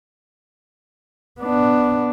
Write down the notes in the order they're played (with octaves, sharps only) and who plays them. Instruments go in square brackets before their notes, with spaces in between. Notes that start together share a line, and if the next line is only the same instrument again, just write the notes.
[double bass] B3 D4